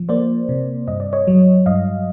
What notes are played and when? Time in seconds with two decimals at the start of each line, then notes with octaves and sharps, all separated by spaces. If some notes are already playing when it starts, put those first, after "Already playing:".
Already playing: F3
0.09 A#3 C5 D5
0.49 C3
0.88 G2 D#5
1.00 D5
1.13 C#5 D#5
1.27 F#3
1.66 G2 D#5 F5